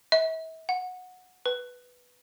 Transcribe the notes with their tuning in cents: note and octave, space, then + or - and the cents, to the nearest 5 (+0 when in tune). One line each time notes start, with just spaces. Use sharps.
E5 -40
F#5 -15
B4 +0